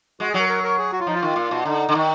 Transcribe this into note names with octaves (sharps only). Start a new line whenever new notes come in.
G#3 F#4
G#4
F#3
A#4
A#4
A#4
G#4
F#4
F4
F3 D#4
F4
D#3
A#2
B2
D3 D#4
D3
D#3